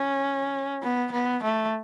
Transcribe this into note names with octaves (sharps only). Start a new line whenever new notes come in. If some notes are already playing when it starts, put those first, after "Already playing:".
Already playing: C#4
B3
B3
A3